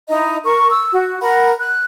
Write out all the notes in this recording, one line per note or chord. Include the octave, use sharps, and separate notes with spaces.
D#4 E4 D#5 A#5
A#4 C#6
E6
F#4
A#4 F#5 B5
F#6